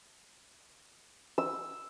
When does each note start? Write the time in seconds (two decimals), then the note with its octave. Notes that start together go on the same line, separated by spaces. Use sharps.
1.38 E6